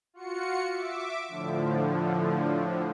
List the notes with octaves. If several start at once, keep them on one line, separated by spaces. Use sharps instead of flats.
F4 F#4 C#7
E5 D6
A2 D3 F3